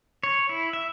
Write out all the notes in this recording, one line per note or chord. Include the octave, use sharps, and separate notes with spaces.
C#5
E4
E5